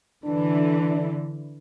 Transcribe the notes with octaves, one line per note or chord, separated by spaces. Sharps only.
D3 E3 D4